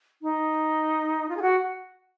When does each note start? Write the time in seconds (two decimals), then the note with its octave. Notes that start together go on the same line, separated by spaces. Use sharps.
0.22 D#4
1.29 F4
1.37 G#4
1.42 F#4